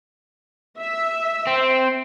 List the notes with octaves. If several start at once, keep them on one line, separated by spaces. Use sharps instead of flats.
E5
C4